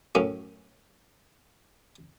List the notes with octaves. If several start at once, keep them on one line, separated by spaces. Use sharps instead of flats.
F#2 A2 C#4